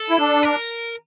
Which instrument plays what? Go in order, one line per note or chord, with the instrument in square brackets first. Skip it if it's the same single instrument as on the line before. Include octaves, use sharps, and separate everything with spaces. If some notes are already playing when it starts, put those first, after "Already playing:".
Already playing: [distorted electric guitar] A4
[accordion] E4
D4
[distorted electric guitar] A#4